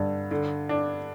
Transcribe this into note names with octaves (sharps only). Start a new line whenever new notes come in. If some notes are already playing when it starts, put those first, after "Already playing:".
Already playing: G2 D3
D3
D4